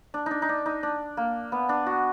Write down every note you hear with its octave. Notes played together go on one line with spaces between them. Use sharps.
D4
D4 D#4
D#4
D4
D#4
D4
A#3
B3
D4
F#4